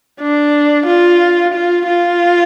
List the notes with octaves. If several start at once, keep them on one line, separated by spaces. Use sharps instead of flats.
D4
F4
F4
F4